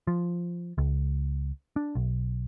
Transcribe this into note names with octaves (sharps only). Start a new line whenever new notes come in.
F3
C#2
D4
B1